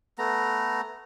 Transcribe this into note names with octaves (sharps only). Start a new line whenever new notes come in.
A3 B3 A#5